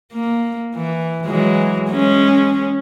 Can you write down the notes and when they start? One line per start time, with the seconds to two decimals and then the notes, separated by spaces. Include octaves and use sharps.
0.13 A#3
0.76 E3
1.26 E3 F#3 G#3
1.88 G#3 C#4